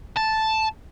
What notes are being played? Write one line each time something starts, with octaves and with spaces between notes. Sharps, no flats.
A5